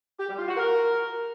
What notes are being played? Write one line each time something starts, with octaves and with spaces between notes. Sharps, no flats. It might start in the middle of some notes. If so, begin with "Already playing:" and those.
G4
G3
F4
F#4
A#4